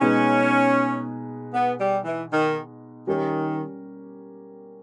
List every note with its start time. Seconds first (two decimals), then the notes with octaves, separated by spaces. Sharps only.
0.01 B2 G#3 C#4 D#4 G#4 B4
1.54 B3
1.79 G3
2.05 E3
2.31 D#3
3.07 D#3 G3 C#4 G4 A#4